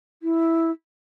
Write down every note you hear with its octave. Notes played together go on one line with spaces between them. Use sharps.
E4